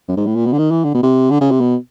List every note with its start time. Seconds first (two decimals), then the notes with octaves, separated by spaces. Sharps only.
0.08 F#2
0.17 G#2
0.27 A2
0.36 A#2
0.46 B2
0.53 D3
0.58 D#3
0.71 E3
0.84 D3
0.94 B2
1.03 C3
1.31 D3
1.41 C#3
1.51 C3
1.61 B2